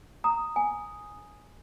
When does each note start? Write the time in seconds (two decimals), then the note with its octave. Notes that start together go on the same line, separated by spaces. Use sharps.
0.24 A#5 D#6
0.56 G#5